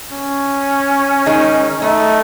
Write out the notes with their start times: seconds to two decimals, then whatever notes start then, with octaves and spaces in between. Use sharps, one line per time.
0.12 C#4
1.26 D#3 G#3 D#4
1.82 A3 D#4